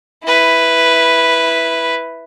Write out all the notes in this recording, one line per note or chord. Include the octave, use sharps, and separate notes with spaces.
E4 B4